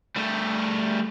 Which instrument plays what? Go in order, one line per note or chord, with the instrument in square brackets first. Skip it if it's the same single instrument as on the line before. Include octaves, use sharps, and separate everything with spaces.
[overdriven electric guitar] G3 A3